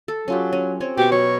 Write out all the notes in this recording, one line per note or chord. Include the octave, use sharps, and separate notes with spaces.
A4
F#3 C#4 F4 G4
C#4
C4 C#4 C#5
B2 G4 C#6
F#3 C#5